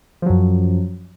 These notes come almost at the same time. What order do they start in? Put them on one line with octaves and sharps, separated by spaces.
F3 F#3 F#2